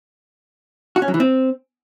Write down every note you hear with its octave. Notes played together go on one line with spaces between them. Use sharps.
F#4
C#4
F#3
E3
C4